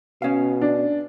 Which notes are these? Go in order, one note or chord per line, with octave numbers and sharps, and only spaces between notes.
B2 C#4 F5
D4